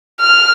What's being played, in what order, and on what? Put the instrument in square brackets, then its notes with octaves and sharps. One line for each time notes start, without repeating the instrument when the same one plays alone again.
[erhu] F6